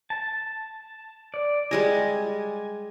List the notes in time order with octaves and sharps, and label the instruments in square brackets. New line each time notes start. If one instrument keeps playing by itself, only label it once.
[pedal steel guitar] A5
D5
[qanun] G3 G#3 D#5 [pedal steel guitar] G#5